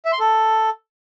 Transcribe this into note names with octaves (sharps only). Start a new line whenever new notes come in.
E5
C6
A4